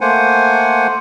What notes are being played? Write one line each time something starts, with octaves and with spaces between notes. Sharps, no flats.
A3 A#3 C5 F#5 G#5